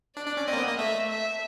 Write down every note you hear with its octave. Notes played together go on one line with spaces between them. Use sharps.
D4 D5
D4
C#4
C4 D#5
A#3
B3
A#3
A3 E5
E5